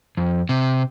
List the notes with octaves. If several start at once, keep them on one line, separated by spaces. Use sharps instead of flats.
F2
C3